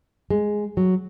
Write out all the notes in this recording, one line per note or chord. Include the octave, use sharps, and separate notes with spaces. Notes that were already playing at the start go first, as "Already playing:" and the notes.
G#3
F#3